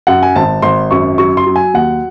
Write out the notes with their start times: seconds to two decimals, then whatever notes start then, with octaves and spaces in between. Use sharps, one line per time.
0.07 F#2 F#5
0.23 G#5
0.35 G#1 A5
0.62 G#1 C6
0.91 F#2 C#6
1.18 F#3 C#6
1.37 C6
1.46 F#3
1.56 G#5
1.74 D#2 F#5